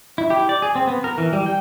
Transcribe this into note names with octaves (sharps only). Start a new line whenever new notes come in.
E4
G4
D5
G#4
C4
B3
A#4
E3
G3
G5